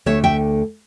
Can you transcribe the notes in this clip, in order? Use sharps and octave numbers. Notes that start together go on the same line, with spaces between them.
D2 D3 A3 C#5 E5
E5 G5